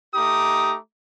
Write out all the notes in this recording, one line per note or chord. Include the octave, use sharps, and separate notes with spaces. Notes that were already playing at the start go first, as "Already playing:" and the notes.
A3 D#4 G4 A#5 D6 D#6